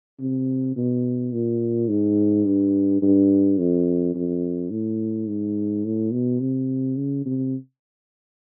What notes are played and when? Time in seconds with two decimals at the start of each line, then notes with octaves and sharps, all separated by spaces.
0.20 C3
0.76 B2
1.33 A#2
1.88 G#2
2.45 G2
3.02 G2
3.59 F2
4.14 F2
4.71 A2
5.28 G#2
5.85 A2
6.12 B2
6.40 C3
6.96 C#3
7.25 C3